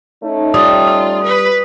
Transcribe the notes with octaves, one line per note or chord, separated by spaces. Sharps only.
A3 C#4 D#4
G3 F4 D#6
D#6
B4